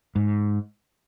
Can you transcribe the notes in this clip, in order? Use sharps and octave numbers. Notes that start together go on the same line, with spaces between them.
G#2